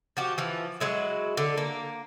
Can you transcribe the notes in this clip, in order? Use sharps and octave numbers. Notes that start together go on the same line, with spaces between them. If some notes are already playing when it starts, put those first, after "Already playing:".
F3 F#4 G4
E3 F3
F#3 G#3 E4
D3
A#3